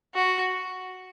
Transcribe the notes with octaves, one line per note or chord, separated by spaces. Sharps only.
F#4